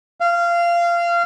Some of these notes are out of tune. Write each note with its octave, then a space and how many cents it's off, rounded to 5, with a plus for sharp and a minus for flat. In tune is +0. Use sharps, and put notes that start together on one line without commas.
F5 -20